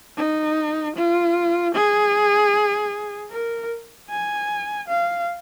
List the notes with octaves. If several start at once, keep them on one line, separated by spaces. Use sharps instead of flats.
D#4
F4
G#4
A#4
G#5
F5